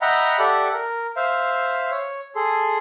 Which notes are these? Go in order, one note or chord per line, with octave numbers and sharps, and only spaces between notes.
D#5 E5 F#5 G5 A#5 B5
G4 A4 D5 E5 F#5
A#4
C5 E5 F5
C#5
G#4 A4 C6